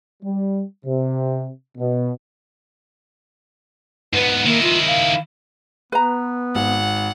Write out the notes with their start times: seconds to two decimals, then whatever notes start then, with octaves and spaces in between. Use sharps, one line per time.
0.23 G3
0.85 C3
1.78 B2
4.14 G#2 B3 B4
4.45 D#3 A#3 E4
4.63 F4
4.87 F5
5.92 B3 B4 A#5
6.55 G#1 F#5